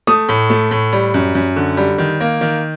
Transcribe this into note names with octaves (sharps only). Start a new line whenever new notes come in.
A3 D#6
A2
A3
A2
G3
F#2
F#2
D3
G3
D#3
A#3
D#3